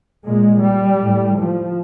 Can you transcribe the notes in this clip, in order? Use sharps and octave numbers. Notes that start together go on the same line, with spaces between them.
A#2 G#3
G3
A2
F3